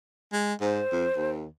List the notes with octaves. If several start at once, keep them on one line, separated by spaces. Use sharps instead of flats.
G#3
G#2 C5
F2
D#2